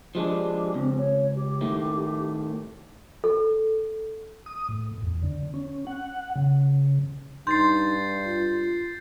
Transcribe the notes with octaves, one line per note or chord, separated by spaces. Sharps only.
F3 G#3 D4 G4
C#2 C4
C#5
G4
A2 D#3 A3
A4
D#6
A2
E2
D3
C#4
F#5
C#3
G2 D#4 C6 G6 A6 C7
F4